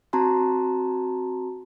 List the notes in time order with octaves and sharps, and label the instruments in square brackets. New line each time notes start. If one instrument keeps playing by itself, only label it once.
[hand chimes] C4 F#4 A5 A#5 C6